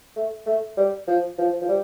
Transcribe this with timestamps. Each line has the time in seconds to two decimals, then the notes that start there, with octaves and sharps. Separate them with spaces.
0.16 A3
0.46 A3
0.77 G3
1.07 F3
1.38 F3
1.61 F3
1.69 G3